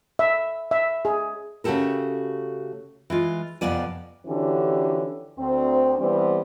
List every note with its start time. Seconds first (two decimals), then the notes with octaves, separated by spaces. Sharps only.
0.19 E5
0.71 E5
1.05 G#4
1.64 C#3 A3 F#4 G4 A4 A#4
3.10 E3 G#3 F4
3.61 F2 C3 F3 B3 D5 G#5
4.27 D3 E3 F3 C#4 F#4 G4
5.38 D2 C4
5.98 E3 G3 B3 C4